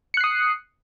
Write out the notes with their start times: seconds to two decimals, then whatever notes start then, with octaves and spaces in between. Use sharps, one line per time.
0.14 C#7
0.17 F#6
0.21 C7
0.24 D#6